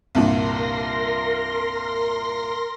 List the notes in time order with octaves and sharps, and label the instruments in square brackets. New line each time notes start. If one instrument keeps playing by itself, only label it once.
[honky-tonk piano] C2 G2 A#2 [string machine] A#4 C6 A#6